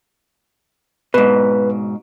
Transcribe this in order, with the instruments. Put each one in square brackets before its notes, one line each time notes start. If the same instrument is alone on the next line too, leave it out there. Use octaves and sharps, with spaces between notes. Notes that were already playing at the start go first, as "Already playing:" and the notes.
[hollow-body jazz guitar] G#2 B2 [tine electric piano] B4